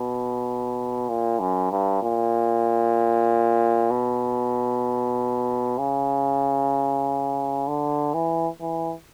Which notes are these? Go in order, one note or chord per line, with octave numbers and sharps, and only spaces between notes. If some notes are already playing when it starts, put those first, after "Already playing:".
Already playing: B2
A#2
F#2
G2
A#2
B2
C#3
D3
E3
E3